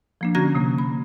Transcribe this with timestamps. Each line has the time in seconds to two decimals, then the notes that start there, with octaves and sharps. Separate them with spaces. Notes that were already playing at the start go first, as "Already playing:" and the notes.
0.21 F3 A#3 D4
0.35 D3 C#4 F#4 A#5 G#6 A#6
0.55 C3 A#3
0.78 B5